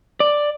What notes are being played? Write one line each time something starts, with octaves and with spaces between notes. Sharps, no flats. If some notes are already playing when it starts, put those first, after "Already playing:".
D5